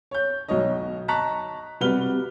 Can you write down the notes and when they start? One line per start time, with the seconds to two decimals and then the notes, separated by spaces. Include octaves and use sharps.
0.11 C#5 G6
0.48 B1 B2 D#4 C#5 D#5
1.08 D#5 A5 A#5 C#6 F#6 B6
1.81 C3 G3 F#4 B4 F6 G7